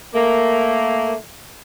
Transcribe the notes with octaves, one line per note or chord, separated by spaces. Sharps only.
A3 A#3